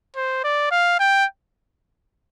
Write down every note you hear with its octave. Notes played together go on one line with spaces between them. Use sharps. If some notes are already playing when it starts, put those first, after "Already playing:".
C5
D5
F5
G5